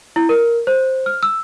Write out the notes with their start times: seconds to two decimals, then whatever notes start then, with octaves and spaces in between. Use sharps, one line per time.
0.16 E4
0.29 A#4
0.67 C5
1.06 F6
1.23 E6